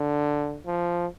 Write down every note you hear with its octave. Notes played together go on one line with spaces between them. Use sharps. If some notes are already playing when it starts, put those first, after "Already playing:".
Already playing: D3
F3